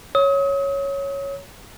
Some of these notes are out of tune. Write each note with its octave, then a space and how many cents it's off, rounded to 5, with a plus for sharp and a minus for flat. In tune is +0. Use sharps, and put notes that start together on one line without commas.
C#5 +0 D#6 +40